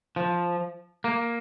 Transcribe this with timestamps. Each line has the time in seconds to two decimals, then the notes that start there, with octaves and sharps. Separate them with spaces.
0.16 F3
1.04 A#3